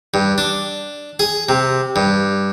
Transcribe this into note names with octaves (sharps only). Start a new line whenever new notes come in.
G2
D4
G#4
C3
G2